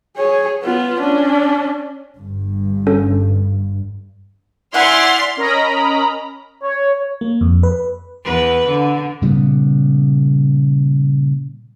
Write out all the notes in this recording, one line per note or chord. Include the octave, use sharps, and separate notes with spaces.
G#4 C#5
B3 F4
C#4 D4
G1 G2
C#4 A4
E4 D5 F#5 G#5 C6 F6
C#4 A#4 D#5 A#5 B5
C#5
A#3
F2
B4
E2 B4
D3
A#2 C#3 G3 B3